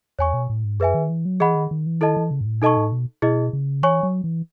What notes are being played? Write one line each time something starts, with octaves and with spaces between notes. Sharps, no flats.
E2 C#5 G#5 C#6
B2
A2
G#2
F#2 G#4 B4 E5 G#5
D#3
E3
F#3
E3 G#4 D#5 F#5 B5
D#3
D#3
E3
D#3 E4 A4 D#5 A5
E3
C#3
G#2
A2
B2 D#4 A4 D#5 A5 C#6
A2
B2
B2 E4 G#4 D#5
C#3
E3 C#5 G#5 C#6
F#3
E3